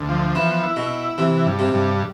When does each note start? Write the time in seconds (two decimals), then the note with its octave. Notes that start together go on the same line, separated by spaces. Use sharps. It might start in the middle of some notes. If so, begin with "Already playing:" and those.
Already playing: D2
0.09 F3
0.35 E3 B3
0.63 E4
0.76 B2
0.91 E4
1.18 C3 E3
1.46 G2
1.59 C3
1.73 G2